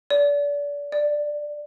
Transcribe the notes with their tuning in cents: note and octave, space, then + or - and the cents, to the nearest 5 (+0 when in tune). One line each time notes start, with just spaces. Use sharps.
D5 -30
D5 +10